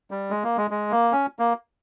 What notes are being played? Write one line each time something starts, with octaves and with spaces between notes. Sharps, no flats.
G3
G#3
A#3
G#3
G#3
A#3
C#4
A#3